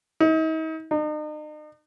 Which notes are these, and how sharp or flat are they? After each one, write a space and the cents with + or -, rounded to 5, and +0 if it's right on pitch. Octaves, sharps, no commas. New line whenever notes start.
D#4 +40
D#4 -40